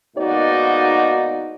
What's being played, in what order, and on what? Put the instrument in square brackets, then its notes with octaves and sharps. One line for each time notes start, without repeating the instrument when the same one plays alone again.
[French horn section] G#2 B2 A#3 D#4 F#4 D5